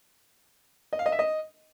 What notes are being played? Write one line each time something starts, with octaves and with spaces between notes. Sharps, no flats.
D#5
F5
D#5
E5
D#5